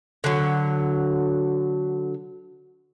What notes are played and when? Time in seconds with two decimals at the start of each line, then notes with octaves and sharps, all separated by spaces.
0.24 D3 F#3